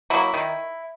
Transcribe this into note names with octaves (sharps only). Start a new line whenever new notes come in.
F#3 A#3 E4
D#3